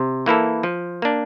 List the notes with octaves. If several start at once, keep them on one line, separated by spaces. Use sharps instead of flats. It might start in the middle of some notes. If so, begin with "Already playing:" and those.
Already playing: C3
E3 A#3 E4 A4
F3
A#3 D4